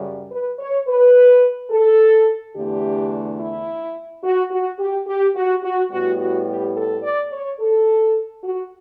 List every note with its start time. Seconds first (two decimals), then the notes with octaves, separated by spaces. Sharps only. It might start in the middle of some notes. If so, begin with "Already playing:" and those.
Already playing: F#2 C#3 G3
0.31 B4
0.59 C#5
0.88 B4
1.71 A4
2.55 E2 D3 A3 D4 G4
3.40 E4
4.24 F#4
4.51 F#4
4.79 G4
5.07 G4
5.35 F#4
5.63 F#4
5.91 A2 G3 B3 F#4
6.20 F#4
6.47 G4
6.75 A4
7.03 D5
7.32 C#5
7.60 A4
8.44 F#4